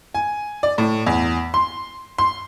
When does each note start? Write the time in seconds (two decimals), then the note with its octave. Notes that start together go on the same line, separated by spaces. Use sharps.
0.14 G#5
0.63 D5
0.78 A2
1.06 E2
1.54 C6
2.18 C6